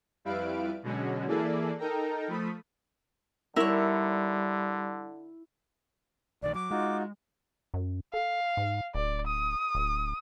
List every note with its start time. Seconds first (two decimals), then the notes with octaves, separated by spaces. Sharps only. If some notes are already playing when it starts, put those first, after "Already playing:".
0.25 F2 G3 E4 B4 F5 D7
0.83 B2 D3 F#3 G#3 C#4 F#4
1.27 E3 A#3 E4 G#4 A4 D5
1.78 D#4 A4 A#4 G5 A#5
2.28 F3 A3 B5 D#6
3.56 D3 G3 E4 A#4 C#5
6.43 A#1 D#3 D5
6.55 F#3 D6
6.71 G#3 D#4 F4 F#4
7.74 F#2
8.14 A4 F5
8.57 G#2
8.95 D1 D5
9.27 D#6
9.75 D1